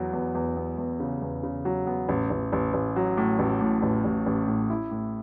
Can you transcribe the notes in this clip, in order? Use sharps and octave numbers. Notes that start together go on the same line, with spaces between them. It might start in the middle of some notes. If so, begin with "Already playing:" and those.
Already playing: E2 F#3 B3
E2
E2
B3
E2
C#3
E2
C#3
F#3
B3
A1
A1
A1
A1
F#3
A2
A1
A2
A1
A1
A1
A2
E4
A2